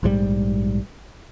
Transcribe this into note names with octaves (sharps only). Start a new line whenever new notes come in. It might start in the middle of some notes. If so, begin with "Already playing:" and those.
A#1 G#2 E3 G3